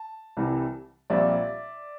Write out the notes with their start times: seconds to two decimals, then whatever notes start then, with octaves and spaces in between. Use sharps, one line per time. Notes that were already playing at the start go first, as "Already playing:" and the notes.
Already playing: A5
0.37 C2 C3 E3 G3
1.10 A#1 A#2 G3 C4 D5 E5